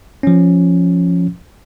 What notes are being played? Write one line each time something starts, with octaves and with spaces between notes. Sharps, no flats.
F3 C#4